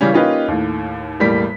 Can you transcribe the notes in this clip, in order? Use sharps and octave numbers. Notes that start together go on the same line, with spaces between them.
C#3 E3 G3 C#4
A#3 C#4 D#4 F4 G4 B4
D#2 A2
E1 A2 G3 A#3 B6